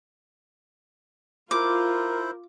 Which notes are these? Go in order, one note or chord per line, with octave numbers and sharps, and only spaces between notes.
E4 F4 A#4 C5 D6